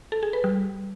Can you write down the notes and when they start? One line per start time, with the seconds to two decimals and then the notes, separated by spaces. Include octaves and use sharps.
0.12 A4
0.23 G#4
0.33 B4
0.44 G3